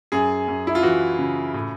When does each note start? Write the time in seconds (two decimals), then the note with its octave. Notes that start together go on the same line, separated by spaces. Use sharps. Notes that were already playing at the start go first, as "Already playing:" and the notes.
0.12 F#2 G#4
0.48 F#2
0.67 E4
0.75 F4
0.83 E3 F#4
1.18 C#3
1.54 A2